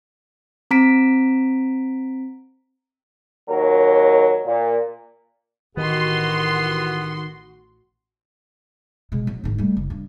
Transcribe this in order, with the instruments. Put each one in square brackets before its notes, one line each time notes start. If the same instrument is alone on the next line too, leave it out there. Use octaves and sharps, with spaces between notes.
[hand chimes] C4 A#5 B6 D7
[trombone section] D#2 F#3 A#4
A#2
[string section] A1 F#4 C6 [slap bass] D#3 [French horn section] E3 G4 [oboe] B3
[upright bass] B2 G#3
F#3
G#2 D#3
G3 A3
F#1
G2